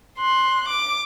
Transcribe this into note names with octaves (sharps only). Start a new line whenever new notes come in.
C6 F#6
D6